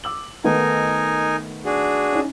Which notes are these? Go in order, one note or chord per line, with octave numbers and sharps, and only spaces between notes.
D6 E6 F#7
D#3 A3 B3 D#4 A#4 G#5
D4 F#4 G#4
C#4 D#4